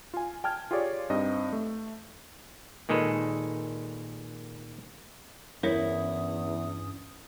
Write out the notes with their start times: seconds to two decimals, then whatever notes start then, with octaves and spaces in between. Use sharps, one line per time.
0.14 F4 G#5
0.44 G5 A5 F6 G#6
0.71 F4 G4 G#4 C#5 D5
1.10 G2 C4 D#4 D#5
1.53 A3
2.89 A#2 D#3 G#3 A4 B4
5.63 E2 G2 C#4 E4 A#4 C#5 E5 D#6